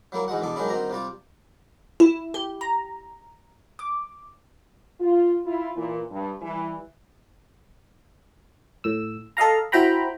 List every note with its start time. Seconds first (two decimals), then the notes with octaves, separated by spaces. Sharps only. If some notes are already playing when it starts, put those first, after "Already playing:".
0.12 F#3 G3 A#3 E4
0.28 G#2 E3 G#3 F#4 F#5
0.41 E2 B2 D3 A4 D6
0.56 D#3 F#3 G#3 C#4 D4 E4
0.69 G2 D#3 C4 F#4 A#5
0.90 C3 G3 F4 D5
2.00 E4
2.34 G4
2.61 A#5
3.79 D6
5.00 F4
5.45 E4 F4
5.76 A#2 E3
6.10 G2
6.40 E3 G3
8.84 A2 E6
9.37 A4 D#5 F5 A#5
9.72 E4 F#4 C5 G5 A#5 B5